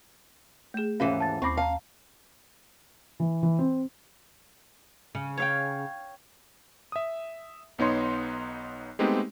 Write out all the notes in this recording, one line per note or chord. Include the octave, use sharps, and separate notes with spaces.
A3 G#4 G6 E7
D#2 G#2 E3 C#4 F5 A#6
A5 A6
D#2 C4 B5 C#6 D6 A#6 C7
F5 A5 A#5
E3
E3
C4
C#3
C#5 F5 G5
E5 D#6
B1 B3 D#4 C#5 C6
G#3 A3 B3 C4 D#4 G4